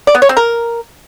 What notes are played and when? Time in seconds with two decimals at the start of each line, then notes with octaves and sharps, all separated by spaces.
0.07 D5
0.15 B3
0.22 C#5
0.29 C4
0.37 A#4